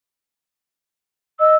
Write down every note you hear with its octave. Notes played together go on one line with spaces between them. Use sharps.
D#5 E6